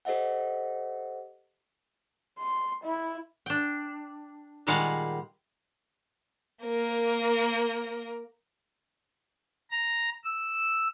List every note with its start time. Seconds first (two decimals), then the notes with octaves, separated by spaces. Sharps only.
0.05 G4 A4 C5 D#5 E5 F#5
2.39 C6
2.84 E4
3.46 D4 G5
4.67 A#2 D#3 G3 G#3 F5 F#5
6.64 A#3 A#4
9.71 A#5
10.25 E6